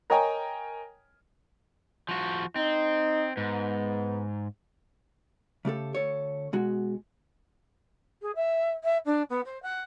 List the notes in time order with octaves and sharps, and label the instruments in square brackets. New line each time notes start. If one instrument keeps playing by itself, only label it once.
[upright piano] A#4 C#5 D#5 G5 G#5 A#5
[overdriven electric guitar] F3 F#4
[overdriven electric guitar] C4 [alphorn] D#4
[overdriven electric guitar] G#2 [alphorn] B3
[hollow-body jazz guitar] C#3 A3 G4 A4
D2 A4 C#5
B2 G#3 F#4
[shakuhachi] G#4
E5
E5
D4
B3
C5
F#5